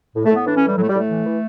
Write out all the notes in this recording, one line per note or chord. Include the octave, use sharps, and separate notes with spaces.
A2
A3
A2
B3
E3 D4
C#4
A2 G3
A2 F#3
A3
G3
A2
A3
E3
E3